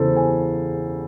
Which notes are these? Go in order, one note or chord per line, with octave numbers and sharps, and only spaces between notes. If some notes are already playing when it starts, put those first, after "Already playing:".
Already playing: E2 C#3 E3 A4 C5
G#5